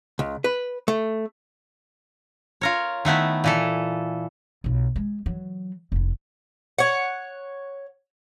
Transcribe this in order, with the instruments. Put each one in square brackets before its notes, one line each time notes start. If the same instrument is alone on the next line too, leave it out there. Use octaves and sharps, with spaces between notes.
[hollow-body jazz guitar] C#2
B4
A3
[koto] F4 A#4 C#5
D#3 A3 B3 E4
A#2 E3 A4
[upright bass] B1 F4
G#3
E3 F#3
F1 E4
[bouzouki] C#5 F#5